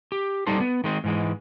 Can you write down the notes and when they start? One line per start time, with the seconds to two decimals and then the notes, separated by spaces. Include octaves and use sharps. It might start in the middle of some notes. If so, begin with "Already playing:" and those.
0.12 G4
0.47 G3 D#4 G4 A4 C5
0.60 B3
0.84 D#3 G#3 C4
1.04 G#2 E3 G#3